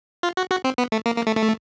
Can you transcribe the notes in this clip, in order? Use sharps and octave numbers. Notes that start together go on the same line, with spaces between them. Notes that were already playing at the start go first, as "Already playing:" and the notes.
F4
F#4
F#4
C4
B3
A3
A#3
A#3
A3
A3